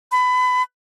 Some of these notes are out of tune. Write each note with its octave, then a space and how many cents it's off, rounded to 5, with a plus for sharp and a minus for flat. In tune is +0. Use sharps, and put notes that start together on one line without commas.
B5 +25